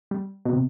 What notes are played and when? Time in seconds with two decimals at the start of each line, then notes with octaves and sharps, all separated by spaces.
0.11 G3
0.45 B2
0.53 C3